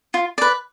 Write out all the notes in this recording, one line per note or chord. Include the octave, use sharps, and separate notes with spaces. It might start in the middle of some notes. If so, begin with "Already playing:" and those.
F4
B4 D5